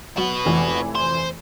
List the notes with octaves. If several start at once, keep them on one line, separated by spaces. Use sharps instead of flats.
F#3 F#4 B4
F1 E3
C5